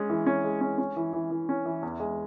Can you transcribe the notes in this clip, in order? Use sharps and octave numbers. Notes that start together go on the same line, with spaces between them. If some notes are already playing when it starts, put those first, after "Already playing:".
Already playing: G#3 C#4
E3
C#4
G#3
C#4
C#4
E3
E3
E3
C#4
E3
E2
G#3